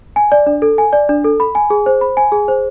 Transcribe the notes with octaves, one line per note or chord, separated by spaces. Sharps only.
G#5
D5
D4
A4
G#5
D5
D4
A4
B5
G#5
G#4
C5
B5
G#5
G#4
C5